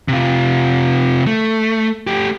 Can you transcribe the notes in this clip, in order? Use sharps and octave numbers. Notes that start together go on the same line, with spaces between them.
C3 F4
A3
A3 G4